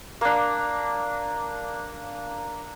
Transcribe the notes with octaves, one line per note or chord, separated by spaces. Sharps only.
A#3 D4